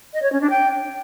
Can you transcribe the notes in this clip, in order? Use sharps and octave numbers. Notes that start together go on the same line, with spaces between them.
D#5
C#5
C#4
D4
G5